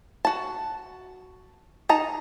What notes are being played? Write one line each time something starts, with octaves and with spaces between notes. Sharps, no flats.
F#4 A5
D#4 A5 A#5